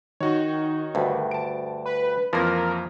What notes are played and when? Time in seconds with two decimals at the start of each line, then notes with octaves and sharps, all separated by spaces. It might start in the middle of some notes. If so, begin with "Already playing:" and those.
0.21 D#3 D#4 F#4 C#5
0.95 D2 G2
1.31 A5 D7
1.86 B4
2.33 F2 E3 F3 A#3 A#4